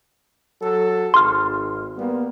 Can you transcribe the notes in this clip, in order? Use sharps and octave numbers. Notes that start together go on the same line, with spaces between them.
F#3 A4
G#1 C6 F6
G3 A#3 B3